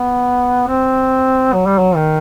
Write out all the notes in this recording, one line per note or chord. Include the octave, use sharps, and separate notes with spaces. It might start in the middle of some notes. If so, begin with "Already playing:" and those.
Already playing: B3
C4
F#3
G3
F#3
D#3